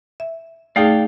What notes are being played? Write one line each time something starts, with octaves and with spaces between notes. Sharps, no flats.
E5
A3 D#4 G#4 D5 F5 G5